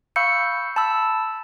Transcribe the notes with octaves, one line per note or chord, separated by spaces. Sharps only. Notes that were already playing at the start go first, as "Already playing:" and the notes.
F5 B5 C#6 E6 G6 C#7
A5 B5 E6